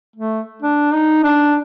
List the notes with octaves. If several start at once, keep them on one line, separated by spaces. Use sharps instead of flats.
A3
D4
D#4
D4